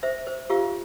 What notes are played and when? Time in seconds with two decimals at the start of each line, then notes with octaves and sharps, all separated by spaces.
0.03 C5 E5
0.27 C5
0.50 F4 G4 F5